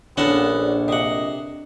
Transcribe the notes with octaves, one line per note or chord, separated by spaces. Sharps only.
A#1 B3 C#4 D4 A4 F#5 A#5
C3 D#5 F#5